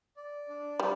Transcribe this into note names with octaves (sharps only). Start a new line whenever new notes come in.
D5
D4
G3